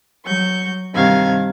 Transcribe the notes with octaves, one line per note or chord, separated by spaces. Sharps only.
F#3 C#6 G6
G2 C3 D#3 F5 G#6